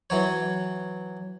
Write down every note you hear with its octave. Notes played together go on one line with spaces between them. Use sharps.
E3 F#3 C#5